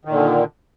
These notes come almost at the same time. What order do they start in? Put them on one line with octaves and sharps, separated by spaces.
D#3 A#2 D3